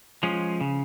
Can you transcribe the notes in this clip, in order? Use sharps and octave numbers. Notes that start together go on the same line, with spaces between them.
F3 G#3 C#4
C#3